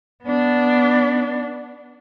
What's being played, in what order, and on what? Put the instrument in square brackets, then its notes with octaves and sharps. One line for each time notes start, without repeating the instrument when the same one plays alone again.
[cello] B3 D4